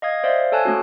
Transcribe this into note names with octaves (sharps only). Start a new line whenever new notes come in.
D#5 F5 D#6 G#6
C5 D5 E5 F5
A4 C#5 G#5 A5 F#6
A3 C#4 F#4